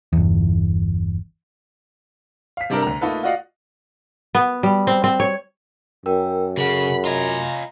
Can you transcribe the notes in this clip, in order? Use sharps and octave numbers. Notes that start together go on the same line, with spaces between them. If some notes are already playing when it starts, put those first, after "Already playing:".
G1 E2
F5 B6
C3 G3 D4 A4 A#4
D2 A#5
A3 A#3 D#4 F4 A4 B4
F4 F#4 D5 D#5 F5 F#5
B3
G3
C4
C4
C#5
F#2 A#4 G5 E6
C#3 G#4 A4 F#5 B5
F4 D#5 G#5 A#5 B5